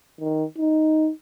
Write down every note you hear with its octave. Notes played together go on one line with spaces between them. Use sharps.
D#3
D#4